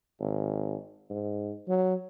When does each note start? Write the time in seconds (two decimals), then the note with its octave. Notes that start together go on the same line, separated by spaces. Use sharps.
0.20 G#1
1.10 G#2
1.68 F#3